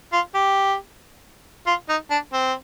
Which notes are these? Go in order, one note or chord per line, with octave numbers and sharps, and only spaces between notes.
F4
G4
F4
D#4
D4
C4